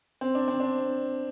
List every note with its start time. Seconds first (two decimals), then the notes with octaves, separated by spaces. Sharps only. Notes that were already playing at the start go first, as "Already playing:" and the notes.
0.21 C4
0.35 D4
0.48 C4
0.60 D4